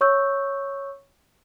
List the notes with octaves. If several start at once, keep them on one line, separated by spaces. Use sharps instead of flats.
C#5 C#6 E6 G6